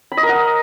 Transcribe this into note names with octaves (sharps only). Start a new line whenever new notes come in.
B5
D#5
A#4
F#5